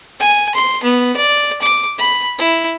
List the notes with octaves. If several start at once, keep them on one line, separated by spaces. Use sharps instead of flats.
G#5
C6
B3
D5
D6
B5
E4